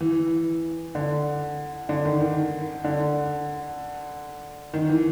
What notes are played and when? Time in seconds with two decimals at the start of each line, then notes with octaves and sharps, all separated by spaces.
0.01 E3
0.95 D3
1.89 D3
2.05 D#3
2.21 D#3
2.85 D3
4.74 D#3
4.89 E3